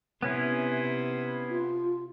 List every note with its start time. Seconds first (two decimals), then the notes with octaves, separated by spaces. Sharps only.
0.22 C3 B3 C#4 E4
1.51 F4